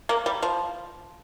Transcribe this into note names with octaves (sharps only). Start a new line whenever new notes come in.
A#3
G3
F3